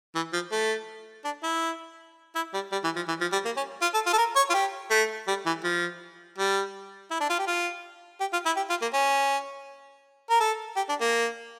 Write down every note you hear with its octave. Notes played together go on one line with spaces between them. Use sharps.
E3
F3
A3
D4
E4
E4
G3
G3
E3
F3
E3
F3
G3
A#3
C#4
F4
A4
F4
A4
A#4
C#5
F4
G4
A3
G3
E3
F3
G3
E4
D4
F4
G4
F4
G4
F4
E4
G4
F4
A#3
C#4
A#4
A4
G4
D4
A#3